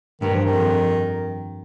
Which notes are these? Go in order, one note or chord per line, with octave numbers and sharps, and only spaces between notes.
G2 D#3
F3
D#3
F2